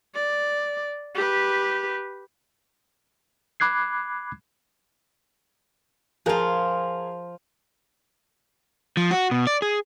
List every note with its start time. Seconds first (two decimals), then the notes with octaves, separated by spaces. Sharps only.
0.15 D5
1.15 G4 B4
3.60 B5 D6 F#6 G#6 C7
6.26 F3 F4 G#4 A#4
8.97 F3
9.11 F#4
9.31 B2
9.47 D5
9.62 G#4